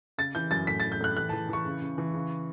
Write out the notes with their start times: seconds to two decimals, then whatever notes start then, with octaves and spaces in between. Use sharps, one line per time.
0.18 C#3 A6
0.35 E3 G6
0.51 F#2 A6
0.67 A2 B6
0.80 A2 A6
0.92 G6
1.01 A2 F#6
1.17 E3 F#6
1.29 E3 A5
1.49 E3 C#6
1.66 C#3
1.82 C#3
1.98 E3
2.14 C#3